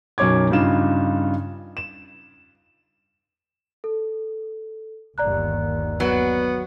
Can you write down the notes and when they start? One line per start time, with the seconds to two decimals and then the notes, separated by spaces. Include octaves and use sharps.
0.18 B1 F#2 C#5 D6 G#6
0.51 G2 C#3 D#4 F4 E7
1.77 E7
3.84 A4
5.18 G1 D#2 D5 A#5 F#6
6.00 F#3 B3